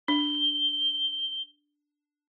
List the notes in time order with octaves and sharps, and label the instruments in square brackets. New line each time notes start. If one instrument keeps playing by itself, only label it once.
[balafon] D4 [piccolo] G7